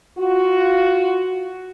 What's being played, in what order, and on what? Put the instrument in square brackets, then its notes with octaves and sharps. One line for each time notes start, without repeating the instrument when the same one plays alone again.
[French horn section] F4 F#4